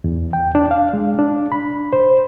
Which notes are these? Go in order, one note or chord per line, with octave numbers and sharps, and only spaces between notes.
E2
G5
D4
F5
G#3
D4
B5
C5